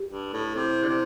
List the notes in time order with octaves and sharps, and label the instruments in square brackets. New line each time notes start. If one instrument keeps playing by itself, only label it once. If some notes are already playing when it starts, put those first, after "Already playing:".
Already playing: [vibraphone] G4
[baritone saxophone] G2
A2
[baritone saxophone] C3 [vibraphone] E4
[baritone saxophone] D3
C3